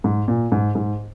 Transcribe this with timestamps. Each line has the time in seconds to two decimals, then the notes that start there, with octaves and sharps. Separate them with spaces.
0.04 G#2
0.28 A#2
0.52 G#2
0.75 G#2